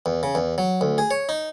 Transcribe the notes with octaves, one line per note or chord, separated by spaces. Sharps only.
E2
C#3
E2
F#3
D2
G#4
C#5
D#4